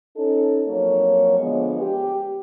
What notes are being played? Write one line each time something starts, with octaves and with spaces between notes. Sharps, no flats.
C#4 D#4 A4
F2 F#3 A#3 C#5
D3 F3 G#3 B3
G4